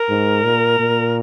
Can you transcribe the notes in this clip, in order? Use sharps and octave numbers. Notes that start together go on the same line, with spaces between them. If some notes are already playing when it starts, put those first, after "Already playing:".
Already playing: A#4
G#2
A#2
A#2